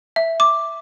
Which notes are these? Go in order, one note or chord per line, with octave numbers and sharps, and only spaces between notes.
E5
D6